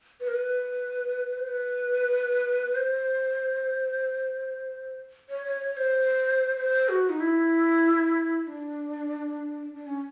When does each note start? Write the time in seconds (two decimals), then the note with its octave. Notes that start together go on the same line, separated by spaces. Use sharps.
0.20 B4
0.28 A#4
0.35 B4
1.38 C5
1.48 B4
2.75 C5
5.29 C#5
5.45 C#5
5.61 C#5
5.77 C5
6.57 C5
6.89 F#4
7.09 D#4
7.20 E4
8.47 D4
9.74 D4
9.87 C#4